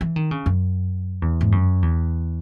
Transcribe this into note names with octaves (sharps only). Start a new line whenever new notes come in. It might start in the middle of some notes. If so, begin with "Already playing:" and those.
E3
D#3
C#3
F#2
E2
G#2
F#2
E2